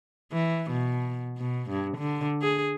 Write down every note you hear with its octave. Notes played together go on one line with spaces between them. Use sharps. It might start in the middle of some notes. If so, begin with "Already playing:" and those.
E3
B2
B2
G2
D3
G#4